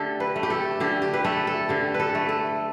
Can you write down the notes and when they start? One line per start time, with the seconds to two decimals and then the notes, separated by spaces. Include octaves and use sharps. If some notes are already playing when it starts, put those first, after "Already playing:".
Already playing: D3 A3 G4 A4
0.20 B4
0.36 A3
0.43 G4
0.50 A4
0.80 D3 G4
1.02 G4
1.14 B4
1.24 A3 A4
1.47 A4
1.69 D3 G4
1.94 B4
2.00 A4
2.15 A3
2.29 A4